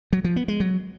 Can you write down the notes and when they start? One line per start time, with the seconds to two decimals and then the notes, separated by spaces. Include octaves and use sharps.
0.13 F#3
0.24 F3
0.36 B3
0.48 G#3
0.60 F#3